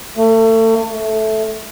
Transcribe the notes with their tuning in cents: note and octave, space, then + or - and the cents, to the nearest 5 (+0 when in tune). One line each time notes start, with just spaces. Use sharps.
A3 +35
A3 -10